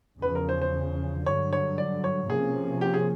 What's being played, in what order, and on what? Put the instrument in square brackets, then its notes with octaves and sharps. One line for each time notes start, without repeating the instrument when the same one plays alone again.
[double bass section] E2 C#3 F3 [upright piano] B4
[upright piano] A#4
C5
C5
[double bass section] G2 D3 F#3 [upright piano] C#5
[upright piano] C#5
D5
C#5
[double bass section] C3 F3 A#3 C#4 [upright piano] G#4
[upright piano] G4
G#4